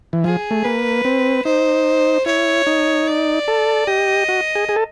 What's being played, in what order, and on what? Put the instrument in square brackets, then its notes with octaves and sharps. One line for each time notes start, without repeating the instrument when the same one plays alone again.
[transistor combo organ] E3
[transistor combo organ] F3 [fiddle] G#4
[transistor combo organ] A3
[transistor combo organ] A#3 [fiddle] B4
[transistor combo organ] C4
[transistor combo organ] D#4 [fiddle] C5
[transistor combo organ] E4 [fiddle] C#5
[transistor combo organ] D#4
[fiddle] D5
[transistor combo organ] A4
[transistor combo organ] G4 [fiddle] D#5
[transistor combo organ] F#4
G#4
G#4
A4